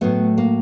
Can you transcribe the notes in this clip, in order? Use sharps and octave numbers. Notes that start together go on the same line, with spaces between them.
A2 F#3 A3 B3
A#3